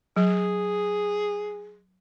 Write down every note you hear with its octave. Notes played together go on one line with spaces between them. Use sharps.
F#3 G#4